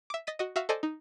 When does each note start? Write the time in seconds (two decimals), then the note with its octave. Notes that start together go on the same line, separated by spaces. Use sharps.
0.10 E5 D6
0.27 D#5 A6 B6 D#7
0.39 F#4 D#5
0.56 F#4 E5 F5
0.69 A4 C5 D5 D#5 G#5
0.83 D#4